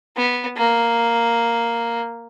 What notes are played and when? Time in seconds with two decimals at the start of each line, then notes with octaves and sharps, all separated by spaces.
0.17 B3
0.57 A#3